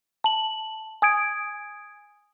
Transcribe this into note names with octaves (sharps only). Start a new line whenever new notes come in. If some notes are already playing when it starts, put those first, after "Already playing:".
A5 F#7
G#5 D#6 G#6 D7